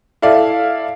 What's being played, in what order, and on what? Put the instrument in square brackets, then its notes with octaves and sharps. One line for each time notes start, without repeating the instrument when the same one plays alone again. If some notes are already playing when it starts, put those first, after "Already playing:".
[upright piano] E4 A4 D5 F5